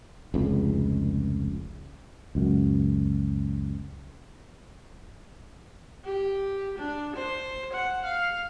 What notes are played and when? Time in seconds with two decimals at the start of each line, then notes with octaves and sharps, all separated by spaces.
0.34 F1 C#2
2.35 C#2 F#2
6.05 G4
6.79 D4
7.16 C5
7.74 F#5
8.05 F5